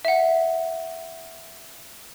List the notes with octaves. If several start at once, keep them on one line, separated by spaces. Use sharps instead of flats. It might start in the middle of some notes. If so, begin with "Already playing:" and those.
E5 F#5